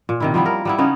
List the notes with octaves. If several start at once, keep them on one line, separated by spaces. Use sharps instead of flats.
A#2
C3 D#3 E4
F3 G3 B3 E4
A#4
G3 B3 E4
C#3 B3 C#4 D#4